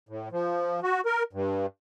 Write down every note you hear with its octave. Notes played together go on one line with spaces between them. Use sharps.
A2
F3
F#4
A#4
G2